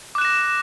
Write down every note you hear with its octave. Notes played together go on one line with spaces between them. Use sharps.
D6 F#6 A#6 E7